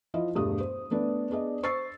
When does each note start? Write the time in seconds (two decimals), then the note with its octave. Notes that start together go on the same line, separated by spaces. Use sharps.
0.14 F3 E4 F4 D#5
0.35 E1 G2 A3 D#6
0.60 C5
0.91 A3 B3 D4
1.30 B3 D4 G#4 D5 D#5
1.63 C5 C#6 E6 A6 C7